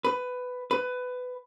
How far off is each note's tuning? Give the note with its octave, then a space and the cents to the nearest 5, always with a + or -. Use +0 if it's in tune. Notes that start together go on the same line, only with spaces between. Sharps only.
B4 +15
B4 +20